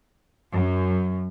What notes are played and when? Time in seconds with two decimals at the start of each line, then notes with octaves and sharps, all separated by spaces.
0.53 F#2